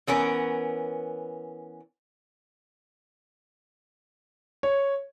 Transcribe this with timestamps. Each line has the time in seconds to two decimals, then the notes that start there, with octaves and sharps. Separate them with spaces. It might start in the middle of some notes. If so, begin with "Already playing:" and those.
0.07 E3 B3 C#4 A#4
4.63 C#5